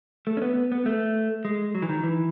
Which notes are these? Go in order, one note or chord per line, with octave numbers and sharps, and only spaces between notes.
A3
C#4
B3
B3
B3
A3
G#3
F#3
E3
D#3
E3